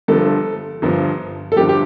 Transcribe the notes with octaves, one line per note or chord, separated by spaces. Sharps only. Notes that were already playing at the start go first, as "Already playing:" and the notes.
G1 G2 F3 A4
G1 G2 F3
A4
G1 G2 F3 G4
G4